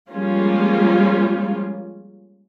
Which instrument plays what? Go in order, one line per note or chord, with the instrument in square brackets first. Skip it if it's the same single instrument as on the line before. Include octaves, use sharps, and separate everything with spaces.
[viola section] F3 G3 G#3 A#3 C#4 F4